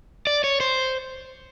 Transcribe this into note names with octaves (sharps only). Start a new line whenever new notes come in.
D5
C#5
C5